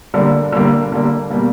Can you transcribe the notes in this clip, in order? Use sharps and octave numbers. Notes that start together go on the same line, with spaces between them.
D3 G3 A#3
D3 G3 A#3
D3 G3 A#3
B2 G3 A#3